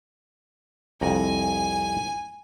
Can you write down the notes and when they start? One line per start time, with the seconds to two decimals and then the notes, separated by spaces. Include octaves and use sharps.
1.01 C2 F2 G#5 A#5